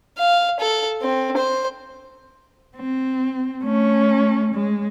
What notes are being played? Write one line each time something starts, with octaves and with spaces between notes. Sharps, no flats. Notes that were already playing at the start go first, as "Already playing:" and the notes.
F5
A4
C4
C5
C4
A3 C#4
G#3